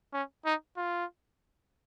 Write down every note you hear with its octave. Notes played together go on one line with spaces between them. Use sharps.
C#4
D#4
F4